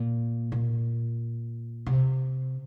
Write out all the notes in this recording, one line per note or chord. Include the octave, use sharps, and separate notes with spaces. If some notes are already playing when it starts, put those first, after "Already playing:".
Already playing: A#2
A#2
C3